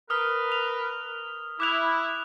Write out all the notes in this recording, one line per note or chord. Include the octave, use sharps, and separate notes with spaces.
A#4 B4 D#6 F6
F7
E4 D6 F#6 F7